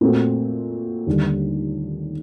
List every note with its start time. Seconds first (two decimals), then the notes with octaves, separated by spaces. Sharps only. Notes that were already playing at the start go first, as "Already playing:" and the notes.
0.01 A#2 A3 C4 F#4
1.07 D#2 D3 G3